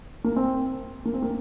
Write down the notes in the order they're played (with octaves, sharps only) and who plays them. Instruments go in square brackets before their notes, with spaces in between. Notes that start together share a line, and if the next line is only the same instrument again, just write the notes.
[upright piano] A#3
C4
A#3
C4
A#3